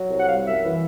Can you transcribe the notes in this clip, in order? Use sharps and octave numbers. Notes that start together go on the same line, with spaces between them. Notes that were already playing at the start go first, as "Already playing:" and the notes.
Already playing: F#3
C2
F#5
G3 F5
F#2 E5
E3